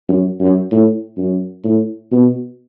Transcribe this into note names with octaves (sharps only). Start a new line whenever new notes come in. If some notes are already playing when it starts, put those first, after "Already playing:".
F#2
F#2
A2
F#2
A2
B2